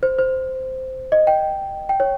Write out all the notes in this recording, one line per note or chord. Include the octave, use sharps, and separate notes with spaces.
C5
C5
D#5
G5
G5
C#5